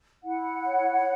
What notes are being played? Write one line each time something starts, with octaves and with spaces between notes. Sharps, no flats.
E4 F#5
C#5